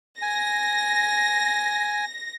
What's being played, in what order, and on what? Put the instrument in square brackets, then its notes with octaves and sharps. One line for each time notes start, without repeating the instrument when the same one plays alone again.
[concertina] G#5 [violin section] A#6